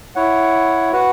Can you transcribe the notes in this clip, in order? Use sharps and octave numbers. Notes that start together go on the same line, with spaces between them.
E4 C#5 F#5
F#4 B4 F#5